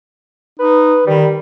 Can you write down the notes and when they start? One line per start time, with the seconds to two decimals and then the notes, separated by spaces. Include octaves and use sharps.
0.59 D#4 B4
1.07 D#3 G3